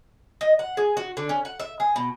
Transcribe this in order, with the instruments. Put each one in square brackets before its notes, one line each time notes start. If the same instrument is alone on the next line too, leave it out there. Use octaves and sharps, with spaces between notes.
[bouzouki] D#5
F#5
G#4
F#4
D3
C#4
F#5
E5
G#4
B2